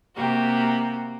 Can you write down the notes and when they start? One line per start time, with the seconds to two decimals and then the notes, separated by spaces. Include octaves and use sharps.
0.16 C3 A#3 F#4 G4